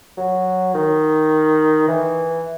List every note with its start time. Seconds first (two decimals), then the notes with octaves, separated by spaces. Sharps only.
0.17 F#3
0.74 D#3
1.88 E3